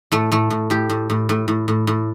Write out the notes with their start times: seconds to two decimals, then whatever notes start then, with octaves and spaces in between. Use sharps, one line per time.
0.12 A2 A3
0.32 A2 A3
0.50 A2
0.70 A2 G4
0.89 A2
1.10 A2
1.29 A2
1.48 A2
1.68 A2
1.87 A2